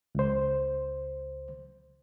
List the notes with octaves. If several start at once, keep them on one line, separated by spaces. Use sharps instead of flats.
C#2 C5